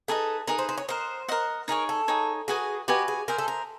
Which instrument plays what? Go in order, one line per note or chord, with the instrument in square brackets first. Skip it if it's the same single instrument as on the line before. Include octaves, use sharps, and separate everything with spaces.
[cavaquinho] D#4 G#4 B4 D#5 [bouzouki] A4
[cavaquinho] D#4 G#4 B4 D#5 [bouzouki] A#4
[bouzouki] C5
C5
C#5
[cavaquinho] A#4 D#5 F#5 [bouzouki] C5
[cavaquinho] A#4 D#5 F#5
[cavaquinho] D#4 G#4 C#5 [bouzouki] A#4
[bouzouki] A4
[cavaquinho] D#4 G#4 C#5
[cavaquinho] F#4 B4 D#5 G#5 [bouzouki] G#4
[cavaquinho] F#4 B4 D#5 G#5 [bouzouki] G4
[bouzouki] G#4
[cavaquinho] G#4 C5 E5 [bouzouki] A#4
[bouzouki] A4
A#4